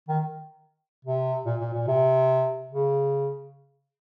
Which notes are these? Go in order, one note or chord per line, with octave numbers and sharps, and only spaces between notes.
D#3
C3
A#2
A#2
A#2
C3
C#3